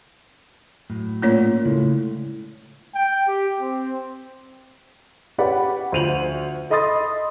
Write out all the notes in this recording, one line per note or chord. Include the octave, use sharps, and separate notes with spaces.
A2 F#3
A#2 A3 C#4 C#5
A2 C#3 G#3
G5
G4
C4
C#4 G4 B4 D5 F#5 B5
D2 F3 C5 D#7 F7 F#7
A4 D#5 B5 C6 D#6 A6